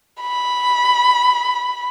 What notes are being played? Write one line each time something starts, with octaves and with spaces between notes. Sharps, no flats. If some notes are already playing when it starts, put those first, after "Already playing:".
B5